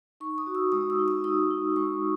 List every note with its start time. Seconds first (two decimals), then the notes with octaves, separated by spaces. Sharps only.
0.20 D#4 C#6
0.38 D#6
0.47 F#4
0.55 E6
0.72 G#3 D#6
0.90 E6
0.99 D#4
1.08 E6
1.24 D#4 D#6
1.51 D#4
1.76 G#3 C#6